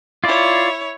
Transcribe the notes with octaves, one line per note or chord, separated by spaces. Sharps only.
E4 F4 C#5 D5